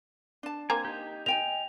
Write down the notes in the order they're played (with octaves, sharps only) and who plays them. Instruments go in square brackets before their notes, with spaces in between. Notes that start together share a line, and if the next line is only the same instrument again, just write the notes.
[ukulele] D4 A5
[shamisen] A#3 C4 A#5 [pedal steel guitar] G#5
[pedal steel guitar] D#4 G4
[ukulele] D#5 G5 G#5 [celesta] F7